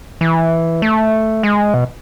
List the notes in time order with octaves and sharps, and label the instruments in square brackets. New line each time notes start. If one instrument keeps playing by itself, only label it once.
[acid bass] E3
A3
G#3
B2